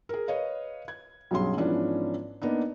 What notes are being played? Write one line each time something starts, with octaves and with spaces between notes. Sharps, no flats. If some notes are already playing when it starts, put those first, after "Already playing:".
G#4 A#4
B4 C#5 D#5 F5
G#6
B1 G2 F#3 C#4 G#4 C6
G#2 E3 F3 B3 C#4 D4
A#3 B3 D4 D#4